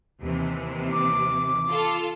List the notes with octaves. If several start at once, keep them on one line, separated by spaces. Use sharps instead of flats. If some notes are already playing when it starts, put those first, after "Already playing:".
D#2 C3 E3
D6
F4 A4